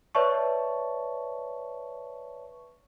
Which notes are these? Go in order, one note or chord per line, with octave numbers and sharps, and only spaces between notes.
B4 C#5 D5 E5 A5 C#6